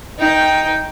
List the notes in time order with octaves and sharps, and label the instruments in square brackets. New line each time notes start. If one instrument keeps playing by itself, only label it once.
[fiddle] D#4 G5